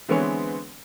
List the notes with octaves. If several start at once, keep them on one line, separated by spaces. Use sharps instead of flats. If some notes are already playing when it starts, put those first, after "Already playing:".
D3 E3 G#3 B3 C4 C#5